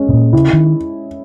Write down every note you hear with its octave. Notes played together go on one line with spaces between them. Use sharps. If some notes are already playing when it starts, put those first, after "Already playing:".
Already playing: G#3 C#4
B2
A#2
C#3 E4
D#3